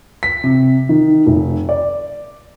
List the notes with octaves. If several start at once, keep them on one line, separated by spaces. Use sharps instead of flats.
B6
C3
D#3
F1
D5